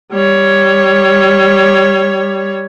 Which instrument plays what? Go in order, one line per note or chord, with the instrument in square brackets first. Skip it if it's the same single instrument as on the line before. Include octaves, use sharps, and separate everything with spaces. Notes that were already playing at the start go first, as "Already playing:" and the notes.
[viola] G3 C#5